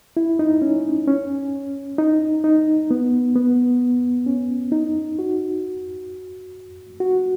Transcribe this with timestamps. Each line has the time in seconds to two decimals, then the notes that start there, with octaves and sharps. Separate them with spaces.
0.17 E4
0.39 D#4
0.62 C#4
1.07 C#4
1.98 D#4
2.44 D#4
2.91 B3
3.36 B3
4.26 C#4
4.72 D#4
5.19 F#4
7.00 F#4